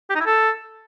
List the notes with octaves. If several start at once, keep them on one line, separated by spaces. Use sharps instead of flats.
G4
D#4
E4
A4